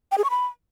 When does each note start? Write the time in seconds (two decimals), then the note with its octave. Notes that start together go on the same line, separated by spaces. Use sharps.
0.12 G5
0.18 G#4
0.24 C#6
0.30 B5